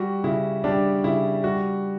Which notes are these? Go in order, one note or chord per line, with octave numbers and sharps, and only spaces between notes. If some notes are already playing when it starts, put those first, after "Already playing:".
Already playing: G3 F#4
C#3 E4
G3 D4
C#3 E4
G3 F#4